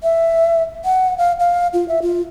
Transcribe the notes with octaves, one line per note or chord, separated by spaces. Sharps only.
E5
F#5
F5
F5
F4
E5
F4